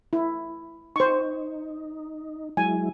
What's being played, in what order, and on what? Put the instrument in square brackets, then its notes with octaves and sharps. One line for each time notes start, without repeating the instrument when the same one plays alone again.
[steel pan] E4
[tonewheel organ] D#4 [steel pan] C5 C#6
[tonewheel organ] F#3 G#3 E4 [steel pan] G#5